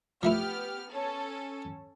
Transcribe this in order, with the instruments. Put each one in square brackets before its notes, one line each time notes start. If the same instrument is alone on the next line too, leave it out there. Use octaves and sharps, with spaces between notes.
[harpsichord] F3 A3 E4 [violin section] B3 G4 F6
[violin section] C#4 A4